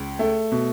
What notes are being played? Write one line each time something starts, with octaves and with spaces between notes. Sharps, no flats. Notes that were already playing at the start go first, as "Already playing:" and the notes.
Already playing: C#2
A3
B2